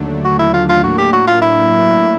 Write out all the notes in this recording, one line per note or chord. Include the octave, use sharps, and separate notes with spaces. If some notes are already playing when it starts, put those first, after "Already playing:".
Already playing: D#2 D3 F#3 A3 D4
F#4
E4
F4
F4
A2 F#3 A#3 D4 F#4
G4
F#4
F4
E4